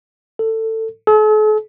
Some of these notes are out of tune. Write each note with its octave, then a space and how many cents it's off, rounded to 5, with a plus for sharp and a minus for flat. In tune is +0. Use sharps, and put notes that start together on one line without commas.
A4 +20
A4 -45